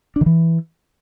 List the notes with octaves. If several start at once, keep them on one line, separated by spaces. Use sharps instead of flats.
D4
D#3
E3